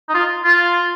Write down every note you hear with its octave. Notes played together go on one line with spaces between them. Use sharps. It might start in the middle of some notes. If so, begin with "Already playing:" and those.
D#4
F4
F4